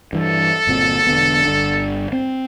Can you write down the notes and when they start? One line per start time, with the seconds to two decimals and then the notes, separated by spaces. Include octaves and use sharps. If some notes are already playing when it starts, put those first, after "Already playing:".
0.13 G2 E3 A4
0.67 G1 A#2 C4
1.07 E1 D3 B3
1.45 G1 D3
2.12 C4